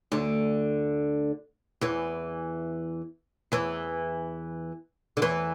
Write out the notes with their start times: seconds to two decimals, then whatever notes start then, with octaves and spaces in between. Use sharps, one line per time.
0.12 D2 D3
1.81 E2 E3
3.52 E2 E3
5.17 D3
5.22 E2 E3